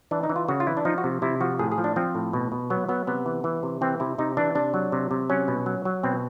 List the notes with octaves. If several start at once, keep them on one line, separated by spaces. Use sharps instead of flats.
E3 D4
D#4
E3
F4
C#3 F#4
F4
E3 E4
D4
F3 D#4
F#4
C3
C3 E4
F3 F#4
A2 G#4
G#4
F3
D4
F3 C4
A2
B2
B2
F#3 B3
F#3 B3
C3 B3
E3
E3
C3
E3 C4
C3 E4
C3 D#4
E3 D4
C3 D4
F#3
C3
C3
F#3 C#4
B2
F#3
F#3
B2 C4